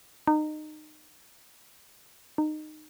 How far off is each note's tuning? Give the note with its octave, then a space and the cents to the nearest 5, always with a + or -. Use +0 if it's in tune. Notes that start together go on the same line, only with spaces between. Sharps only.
D#4 -25
D#4 -20